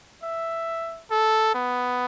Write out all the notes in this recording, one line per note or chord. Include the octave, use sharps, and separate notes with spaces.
E5
A4
B3